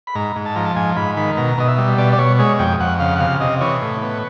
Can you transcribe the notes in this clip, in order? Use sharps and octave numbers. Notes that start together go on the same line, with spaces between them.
B5
G#2 A#5
G#2
A5
F3 A#5
A5
G#2 G#5
G#2 B5
D#3 B5
B2 A#5
B2 D#5
E5
G3
B2 D5
D5
B2 C#5
G#3 C#5
F2 G5
F2 F#5
C#3 F5
F#5
C3 F5
C3 D#5
E3 C#5
A2
B3